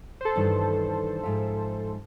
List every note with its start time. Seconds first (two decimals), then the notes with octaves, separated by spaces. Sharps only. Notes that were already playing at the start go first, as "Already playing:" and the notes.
0.21 A4 C5
0.36 G2 D#3 E3
1.23 G#2 F3 E5